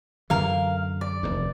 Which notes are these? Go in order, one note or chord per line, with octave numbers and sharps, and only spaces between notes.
F#2 D3 E3 A#4 F5
D5
F1 D#2